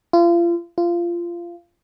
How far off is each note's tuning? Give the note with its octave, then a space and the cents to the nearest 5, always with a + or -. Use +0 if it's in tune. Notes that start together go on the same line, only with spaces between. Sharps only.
F4 -35
F4 -20